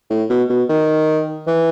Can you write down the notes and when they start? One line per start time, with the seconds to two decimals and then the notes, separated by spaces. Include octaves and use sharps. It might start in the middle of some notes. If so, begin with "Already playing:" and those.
0.10 A2
0.30 B2
0.50 B2
0.69 D#3
1.47 E3